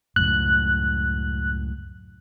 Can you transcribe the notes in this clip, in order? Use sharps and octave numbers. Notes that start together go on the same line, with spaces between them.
C#2 F#2 A2 F#6